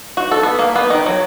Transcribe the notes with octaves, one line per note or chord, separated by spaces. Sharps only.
F#4
A4
B3
A#3
B3
D#3
F#3